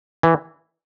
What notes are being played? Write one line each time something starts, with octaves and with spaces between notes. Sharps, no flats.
E3